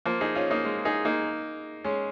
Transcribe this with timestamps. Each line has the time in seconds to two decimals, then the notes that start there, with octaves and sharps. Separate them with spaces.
0.06 F3 A#3
0.21 D#4 G#4
0.35 C#4 F4
0.51 A#3 D#4
0.65 G#3
0.85 D#4 G#4
1.05 A#3 D#4
1.84 G#3 C#4